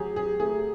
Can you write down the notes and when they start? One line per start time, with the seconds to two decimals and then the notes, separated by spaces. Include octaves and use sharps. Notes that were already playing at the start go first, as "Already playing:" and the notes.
Already playing: F#3 G4 G#4
0.16 G#4
0.40 A3 G#4